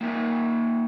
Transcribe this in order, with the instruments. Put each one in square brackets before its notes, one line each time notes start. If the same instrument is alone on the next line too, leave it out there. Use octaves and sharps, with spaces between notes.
[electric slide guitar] A#3 D#4 E5